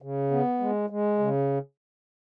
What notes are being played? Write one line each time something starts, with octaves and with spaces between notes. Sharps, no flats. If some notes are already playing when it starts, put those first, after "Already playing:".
C#3
B3
G#3
G#3
C#3